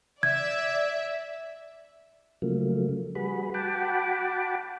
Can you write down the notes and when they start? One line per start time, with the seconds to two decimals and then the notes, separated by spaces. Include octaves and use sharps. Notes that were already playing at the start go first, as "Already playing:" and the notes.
0.23 D5 E5 G#6
2.42 C#3 F3 F#3 A3 A#3
3.15 G3 F#4 G#4 B4 B5
3.54 F#4 F#5 G5 A5 B5 D6